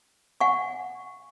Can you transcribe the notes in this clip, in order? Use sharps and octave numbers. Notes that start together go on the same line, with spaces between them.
F#5 G#5 C#6